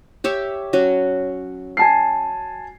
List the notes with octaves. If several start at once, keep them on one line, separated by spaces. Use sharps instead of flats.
G4 C#5 E5
F#3 C#4 F#4
G#5 A5 C7